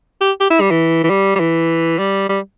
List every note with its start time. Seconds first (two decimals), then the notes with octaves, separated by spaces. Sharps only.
0.21 G4
0.40 G4
0.50 E4
0.61 G3
0.71 E3
1.04 E3
1.10 G3
1.36 G3
1.40 E3
1.99 G3
2.29 G3